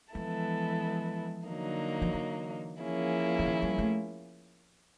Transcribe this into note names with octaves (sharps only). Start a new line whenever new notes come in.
E3 F3 G#3 B3 E4 A4
D3 F#3 A#3 D#4
F3
E3
F3 A#3 C#4 E4 G#4
E3
D#3
G3
A3